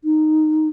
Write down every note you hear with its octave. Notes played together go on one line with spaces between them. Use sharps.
D#4